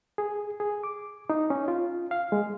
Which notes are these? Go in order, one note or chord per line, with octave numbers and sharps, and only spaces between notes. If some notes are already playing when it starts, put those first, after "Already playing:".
G#4
G#4
D6
D#4
C#4
F4
F5
G#3